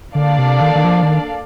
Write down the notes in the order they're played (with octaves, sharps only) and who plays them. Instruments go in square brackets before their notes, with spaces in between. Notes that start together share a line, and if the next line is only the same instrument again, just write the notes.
[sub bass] D3 [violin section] A#3 D4 A4 D5 F5
[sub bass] C3
D#3
D#3
F3
D#3